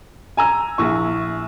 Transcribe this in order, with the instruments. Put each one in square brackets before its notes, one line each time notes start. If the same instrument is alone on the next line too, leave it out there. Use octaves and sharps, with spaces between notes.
[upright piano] G#5 A#5 E6
A#1 E4 C#6